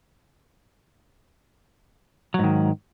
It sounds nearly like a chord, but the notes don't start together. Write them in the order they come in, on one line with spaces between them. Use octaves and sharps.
F#3 G#2 D#3